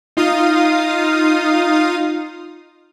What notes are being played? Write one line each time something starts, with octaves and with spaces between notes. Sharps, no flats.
D#4 F4 F5 D#6